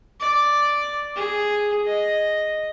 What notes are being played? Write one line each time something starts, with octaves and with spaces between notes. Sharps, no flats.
D5
G#4
D#5